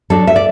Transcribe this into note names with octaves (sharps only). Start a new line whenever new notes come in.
F#3 D4 A4
E5
D5